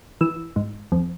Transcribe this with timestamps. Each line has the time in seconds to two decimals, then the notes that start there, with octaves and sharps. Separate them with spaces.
0.21 E3 E6
0.56 G#2
0.92 F2